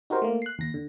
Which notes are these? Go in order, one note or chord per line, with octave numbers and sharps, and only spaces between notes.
D#4 F#4 G4 A#4 C5
A3 A#3
F#6 C7
D#2 A#6
D3